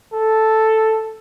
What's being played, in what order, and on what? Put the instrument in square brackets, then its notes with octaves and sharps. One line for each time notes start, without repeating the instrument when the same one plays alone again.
[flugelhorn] A4